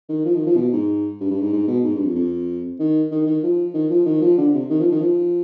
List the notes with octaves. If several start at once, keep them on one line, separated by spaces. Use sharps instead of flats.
D#3
F3
D#3
F3
B2
G#2
G2
G2
G#2
G#2
B2
G#2
G2
F2
F2
D#3
D#3
D#3
F3
D#3
F3
D#3
F3
D3
C3
D#3
F3
D#3
F3